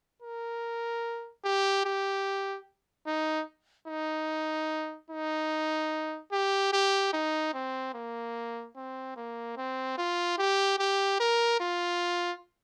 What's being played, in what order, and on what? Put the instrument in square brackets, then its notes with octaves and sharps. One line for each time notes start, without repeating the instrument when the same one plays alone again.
[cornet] A#4
G4
G4
D#4
D#4
D#4
G4
G4
D#4
C4
A#3
C4
A#3
C4
F4
G4
G4
A#4
F4